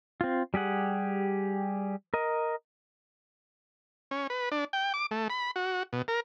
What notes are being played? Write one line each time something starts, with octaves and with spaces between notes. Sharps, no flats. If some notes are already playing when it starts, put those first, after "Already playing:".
C4 F4
G3 G4 G#4 F#5
A#4 D#5
C#4
B4
D4
G5
D6
A3
B5
F#4
B2
A#4